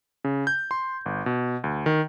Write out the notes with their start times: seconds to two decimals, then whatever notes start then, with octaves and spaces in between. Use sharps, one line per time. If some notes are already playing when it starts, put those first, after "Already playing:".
0.24 C#3
0.47 G6
0.71 C6
1.06 G1
1.26 B2
1.64 D2
1.86 D#3